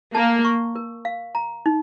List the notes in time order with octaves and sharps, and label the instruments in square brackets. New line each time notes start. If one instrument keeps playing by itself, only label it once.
[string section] A#3 [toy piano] A5
[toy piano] C#6
A#4
F5
A#5
D#4